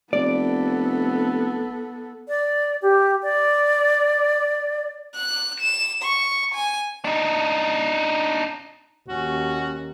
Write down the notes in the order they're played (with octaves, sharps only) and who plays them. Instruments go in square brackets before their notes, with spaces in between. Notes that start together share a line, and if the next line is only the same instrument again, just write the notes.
[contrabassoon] F1 [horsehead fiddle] B3 A4 [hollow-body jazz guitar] D5
[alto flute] D5
G4
D5
[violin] F#6
E7
C#6
G#5
[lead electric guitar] D4 D#4
[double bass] D#2 [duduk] C#4 [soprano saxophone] F#4